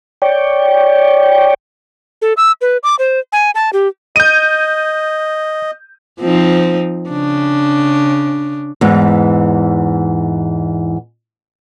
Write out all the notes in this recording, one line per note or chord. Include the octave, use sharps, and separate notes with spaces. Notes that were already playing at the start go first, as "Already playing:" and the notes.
C#5 D5 G5
A4
E6
B4
D6
C5
G#5
A5
G4
D#5 G6 D#7
F3 C4 D#4
C#3 D4
E2 G#2 E3